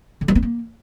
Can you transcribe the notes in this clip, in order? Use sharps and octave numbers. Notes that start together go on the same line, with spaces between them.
D3
F#3
B3
A#3